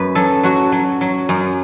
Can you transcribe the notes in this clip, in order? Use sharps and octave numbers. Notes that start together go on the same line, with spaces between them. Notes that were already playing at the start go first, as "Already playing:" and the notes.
Already playing: F#2 B4
F#3 A4
F#3 F#4
F#3
F#3
F#2